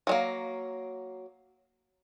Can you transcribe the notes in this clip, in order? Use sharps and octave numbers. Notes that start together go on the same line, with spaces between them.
F#3 G#3 A#3